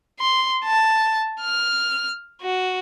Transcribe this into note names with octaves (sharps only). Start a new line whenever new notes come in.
C6
A5
F6
F#4